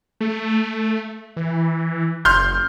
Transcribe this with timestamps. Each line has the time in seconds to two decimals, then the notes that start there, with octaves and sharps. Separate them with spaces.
0.21 A3
1.36 E3
2.25 F#1 C6 F6 G6